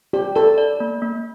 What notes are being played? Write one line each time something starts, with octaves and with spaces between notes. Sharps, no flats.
G4 D5
A4 D5
D5
A#3
A#3